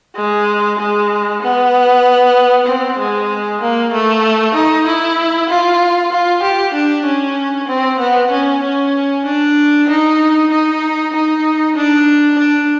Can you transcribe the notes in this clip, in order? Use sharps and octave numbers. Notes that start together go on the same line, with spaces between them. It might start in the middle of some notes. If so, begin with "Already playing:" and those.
G#3
G#3
B3
C4
G#3
A#3
A3
D#4
E4
F4
F4
G4
D4
C#4
C4
B3
C#4
C#4
D4
D#4
D#4
D#4
D4
D4